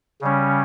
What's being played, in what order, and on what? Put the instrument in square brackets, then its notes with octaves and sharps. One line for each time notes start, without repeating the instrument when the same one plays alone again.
[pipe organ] C#3 G3 C#4